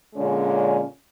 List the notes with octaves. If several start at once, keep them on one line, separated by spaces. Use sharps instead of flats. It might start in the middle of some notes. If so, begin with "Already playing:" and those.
A#2 D3 G#3 C#4